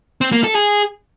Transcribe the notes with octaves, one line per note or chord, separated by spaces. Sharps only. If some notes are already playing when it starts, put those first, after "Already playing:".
C4
A#3
A4
G#4